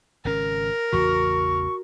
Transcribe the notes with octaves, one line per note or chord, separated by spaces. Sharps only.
G#1 C#3 C#4 A#4
A1 E2 C#3 F#4 C#6